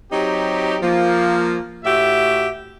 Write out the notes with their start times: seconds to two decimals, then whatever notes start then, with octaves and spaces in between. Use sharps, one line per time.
0.12 F#3 C4 D#4 G4
0.82 F3 A#3
1.84 A2 F#4 G4 E5